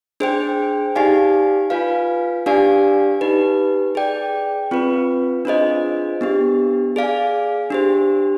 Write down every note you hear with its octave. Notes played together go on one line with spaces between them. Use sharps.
D4 G#4 C5 G5
D#4 G4 D5 F5 G#5
F4 B4 F5 G#5
D4 G4 D5 F5 G#5
D#4 G4 B4
G#4 D5 G5
C4 F4 B4
D4 F4 G#4 C5 D#5
B3 D4 G4
G#4 D5 F5 G#5
D4 G4 C5